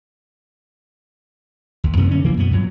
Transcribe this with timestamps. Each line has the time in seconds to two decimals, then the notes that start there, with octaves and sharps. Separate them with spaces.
1.84 D#2
1.97 F#2 C3 B3
2.11 D3 C#4
2.24 C3 E3 F3 A#3
2.37 F#2 B2 B3
2.51 G2 A#2 F#3